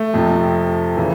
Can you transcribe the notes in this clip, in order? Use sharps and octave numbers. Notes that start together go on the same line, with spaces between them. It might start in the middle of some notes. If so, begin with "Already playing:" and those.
Already playing: A3
F2 C3 F3
C#3 E3